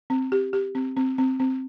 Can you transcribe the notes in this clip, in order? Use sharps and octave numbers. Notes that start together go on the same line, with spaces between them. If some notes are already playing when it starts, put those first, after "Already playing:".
C4
G4
G4
C4
C4
C4
C4